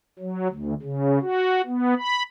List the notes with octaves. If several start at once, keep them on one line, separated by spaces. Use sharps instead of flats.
F#3
D2
C#3
F#4
B3
B5